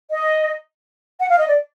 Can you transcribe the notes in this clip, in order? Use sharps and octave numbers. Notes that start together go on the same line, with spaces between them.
D#5
F#5
F5
D#5
D5